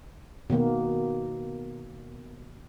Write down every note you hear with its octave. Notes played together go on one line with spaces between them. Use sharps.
B2 D#3 A#3 B3